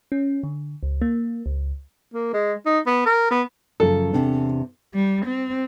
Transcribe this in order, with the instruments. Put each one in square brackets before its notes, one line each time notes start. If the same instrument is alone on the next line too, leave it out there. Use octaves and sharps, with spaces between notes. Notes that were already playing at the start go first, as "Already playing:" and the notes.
[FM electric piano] C#4
D3
C#2
A#3
C#2
[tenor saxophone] A#3
G#3
D#4
B3
A#4
B3
[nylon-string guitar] F#2 C#3 F3 [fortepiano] A4
[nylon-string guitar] E2 C3 D4
[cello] G3
C4